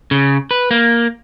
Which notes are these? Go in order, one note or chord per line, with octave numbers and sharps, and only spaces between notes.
C#3
B4
A#3